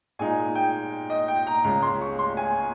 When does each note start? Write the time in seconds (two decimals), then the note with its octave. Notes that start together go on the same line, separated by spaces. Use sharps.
0.19 A#2 G#3 D#4 G#5
0.55 G5
1.10 D#5
1.28 G5
1.47 A#5
1.64 C#2 C#3 G#3 A#5
1.82 C6
2.02 C#6
2.19 C6
2.37 G#5